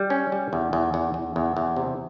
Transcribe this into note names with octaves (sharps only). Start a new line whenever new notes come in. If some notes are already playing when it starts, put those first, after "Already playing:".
Already playing: G3
C#4
G3
E2
E2
E2
E2
E2
E2
C3